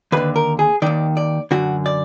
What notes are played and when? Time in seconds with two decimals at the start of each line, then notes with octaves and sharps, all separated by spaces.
0.12 D#2 D3 B4
0.36 A#4
0.59 G#4
0.82 D#2 D#3 D5
1.17 D5
1.51 F#2 D3 F#4
1.86 D5